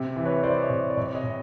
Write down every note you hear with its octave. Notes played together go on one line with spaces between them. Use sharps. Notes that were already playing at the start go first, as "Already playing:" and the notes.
Already playing: C3
E3
B4 C#5
E3 C5 D5
C#5 D#5
C3
D5
C3 C#5 D#5
C#5 D#5
C3